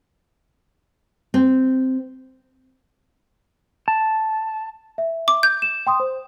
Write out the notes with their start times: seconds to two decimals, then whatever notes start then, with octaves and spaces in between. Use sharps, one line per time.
1.34 C4
3.88 A5
4.98 E5
5.28 D6
5.43 G6
5.62 E7
5.87 G5 C6 D#6
6.00 C5